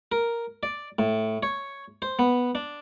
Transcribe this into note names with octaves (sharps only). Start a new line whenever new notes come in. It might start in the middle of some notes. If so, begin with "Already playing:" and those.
A#4
D5
A2
C#5
C5
B3
D4